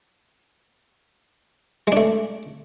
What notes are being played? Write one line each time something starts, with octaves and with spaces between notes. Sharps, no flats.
G#3 A3 D4